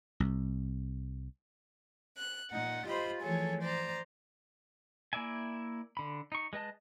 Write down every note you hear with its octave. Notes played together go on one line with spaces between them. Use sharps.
C2
F#6
A#2 D#4 F#5
F4 G4 C5 D#5 B5
E3 F3 A3 G#4 A4 C#5
C5 D5 A#5
A#3 E4 D5 E5 G#5
D3 B5
D#4 C#6
G#3 B4 D#5 A5